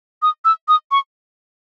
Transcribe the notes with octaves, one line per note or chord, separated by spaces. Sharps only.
D#6
E6
D#6
C#6